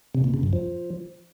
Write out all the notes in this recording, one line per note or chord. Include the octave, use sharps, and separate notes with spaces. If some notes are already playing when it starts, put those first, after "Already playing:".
C3
A#2
C#3
F#2
F3